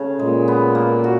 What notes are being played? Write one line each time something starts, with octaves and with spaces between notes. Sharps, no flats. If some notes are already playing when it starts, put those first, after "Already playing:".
Already playing: C#3 A3
A#2 G#3
B3
A#3
F#4